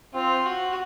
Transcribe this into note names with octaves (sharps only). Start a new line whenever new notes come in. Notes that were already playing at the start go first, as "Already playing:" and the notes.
C4 F4
F#4